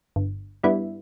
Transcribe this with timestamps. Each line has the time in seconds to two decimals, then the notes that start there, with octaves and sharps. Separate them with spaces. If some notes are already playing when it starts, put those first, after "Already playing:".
0.16 G1
0.63 G2 G3 B3 E4